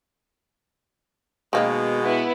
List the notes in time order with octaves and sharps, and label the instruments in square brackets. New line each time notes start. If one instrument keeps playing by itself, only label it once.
[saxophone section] B2 G#3 [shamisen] D#3 A#3 C4
[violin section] B3 E4